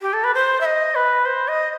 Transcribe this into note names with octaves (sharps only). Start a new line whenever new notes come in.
G4
A4
B4
C5
E5
D#5
B4
C5
D#5